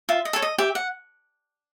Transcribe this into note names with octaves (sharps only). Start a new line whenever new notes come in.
F4 E5
D#5
A4 C#5
D#5
G4 E5
F#5